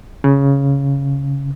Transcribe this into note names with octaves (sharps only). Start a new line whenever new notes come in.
C#3